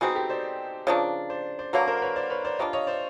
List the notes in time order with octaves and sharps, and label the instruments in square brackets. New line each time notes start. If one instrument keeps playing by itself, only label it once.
[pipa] B2 G#3 C4 D#4 [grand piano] F#4 G#4
[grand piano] G4 A4
C5 D5
[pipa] C#3 F3 A#3 D4
[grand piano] C5 D5
C5 D5
[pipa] D3 F#3 A#3 [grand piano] B4 C#5
[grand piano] A#4 C5
B4 C#5
C5 D5
B4 C#5
C5 D5
[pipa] G3 A#3 D4 F4 [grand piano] C#5 D#5
[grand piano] C#5 D#5
C5 D5